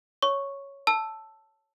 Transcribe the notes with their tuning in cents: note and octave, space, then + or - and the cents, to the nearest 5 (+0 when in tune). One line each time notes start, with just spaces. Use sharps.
C#5 +0 C#6 +0
A5 +0 E6 +0